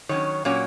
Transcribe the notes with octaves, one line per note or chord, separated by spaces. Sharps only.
D#3 F#3 C#4 C#5
A#2 F#3 A#3 C#4 C#5